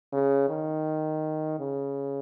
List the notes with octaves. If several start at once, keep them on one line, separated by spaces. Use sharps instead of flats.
C#3
D#3
C#3